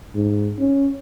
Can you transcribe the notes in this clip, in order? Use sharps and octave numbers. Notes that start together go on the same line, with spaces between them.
G#2
C#4